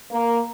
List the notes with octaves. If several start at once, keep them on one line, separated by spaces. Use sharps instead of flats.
A#3